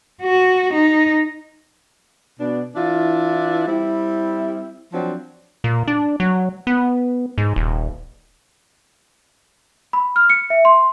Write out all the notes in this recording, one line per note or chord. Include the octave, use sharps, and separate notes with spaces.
F#4
D#4
B2 D4
E3 D4 E4 F4
G3 C4 E4
F3 F#3 C4 D4
A#2
D4
F#3
B3
G#2
D#1
B5
F6
C#7
E5
C6